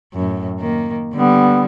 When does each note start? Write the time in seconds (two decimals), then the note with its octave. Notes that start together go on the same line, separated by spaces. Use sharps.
0.14 F#2 A2
0.60 D#3 A#3
1.14 D3 G3 B3